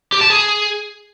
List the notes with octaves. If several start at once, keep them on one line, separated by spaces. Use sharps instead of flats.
G4
A5
G#4